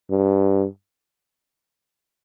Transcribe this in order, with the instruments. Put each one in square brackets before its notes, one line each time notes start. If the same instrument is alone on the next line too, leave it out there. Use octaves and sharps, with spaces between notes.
[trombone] G2